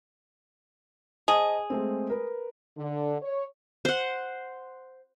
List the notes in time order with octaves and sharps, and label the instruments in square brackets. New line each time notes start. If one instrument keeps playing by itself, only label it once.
[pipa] G#4 [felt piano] C5 D#5 A5
[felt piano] G#3 A3 C4
A#4 B4
[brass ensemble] D3
C#5
[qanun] C5 F#5